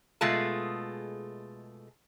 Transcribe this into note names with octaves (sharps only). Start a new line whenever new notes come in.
B2 G#3 A3 F4 G#4 A5